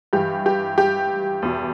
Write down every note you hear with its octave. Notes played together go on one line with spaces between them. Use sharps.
G2 E3 G4
G4
G4
E2 B2